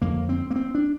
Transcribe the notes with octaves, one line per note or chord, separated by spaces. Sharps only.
F2 D3 A#3
C4
A#3
C4
D4